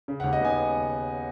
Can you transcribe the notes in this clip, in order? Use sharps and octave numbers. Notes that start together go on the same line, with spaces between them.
C#3
D#2 F#5
D#5
B3 G#5